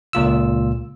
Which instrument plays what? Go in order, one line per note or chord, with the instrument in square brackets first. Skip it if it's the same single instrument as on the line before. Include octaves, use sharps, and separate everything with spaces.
[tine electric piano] C#2 A#2 F4 E6